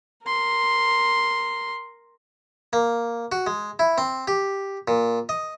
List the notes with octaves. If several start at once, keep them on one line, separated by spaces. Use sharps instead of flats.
A#4 C6
A#3
F#4
G#3
E4
C4
G4
A#2
D#5